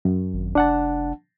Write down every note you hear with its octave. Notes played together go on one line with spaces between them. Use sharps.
F#2
G#1
F1 D4 F#5 A5